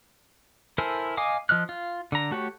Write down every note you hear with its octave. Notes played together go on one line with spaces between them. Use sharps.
E4 A4 A#4 C5 G#5
D#5 F5 G#5 D6 D#6
F3 D#5 F6 F#6
F4
D3 A#5
A3 F#4 G4 C#5